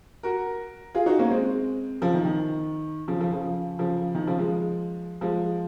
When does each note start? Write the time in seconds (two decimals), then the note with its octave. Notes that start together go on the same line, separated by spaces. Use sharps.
0.23 F#4 A#4
0.95 F4 G#4
1.06 D#4 F#4
1.19 A#3 C#4
1.30 G#3 C4
2.01 C#3 F3
2.14 D#3
2.25 D#3
3.08 C#3 F3
3.20 C#3 F3
3.32 C#3 F3
3.79 C#3 F3
4.15 D#3
4.27 C#3 F3
4.39 F3 G#3
5.21 F3 G#3